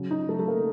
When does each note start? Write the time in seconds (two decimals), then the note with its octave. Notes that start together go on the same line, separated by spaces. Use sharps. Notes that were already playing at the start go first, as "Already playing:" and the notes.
Already playing: C#3 F#3
0.11 D#4
0.29 A3
0.39 A3
0.48 A#3